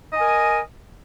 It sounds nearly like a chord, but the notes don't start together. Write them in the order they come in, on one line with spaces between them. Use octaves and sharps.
D#5 G#5 A#4